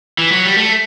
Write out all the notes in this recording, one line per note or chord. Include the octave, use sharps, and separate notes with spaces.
E3
F#3
G3
A3